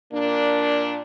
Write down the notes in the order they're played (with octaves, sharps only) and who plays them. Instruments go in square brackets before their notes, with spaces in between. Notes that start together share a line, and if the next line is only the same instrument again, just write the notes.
[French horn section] A#2 A#3 D4